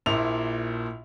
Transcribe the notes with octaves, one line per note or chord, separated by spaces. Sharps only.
A#1 A#2 E4 F7